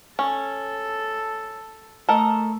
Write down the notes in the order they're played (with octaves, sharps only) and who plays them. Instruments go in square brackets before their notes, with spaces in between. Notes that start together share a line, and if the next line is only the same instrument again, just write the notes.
[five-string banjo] C#4 [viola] A4
[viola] A3 [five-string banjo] A4 A#4 D#5